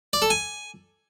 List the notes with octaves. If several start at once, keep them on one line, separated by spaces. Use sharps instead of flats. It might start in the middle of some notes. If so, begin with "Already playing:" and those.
D5
A4
G#5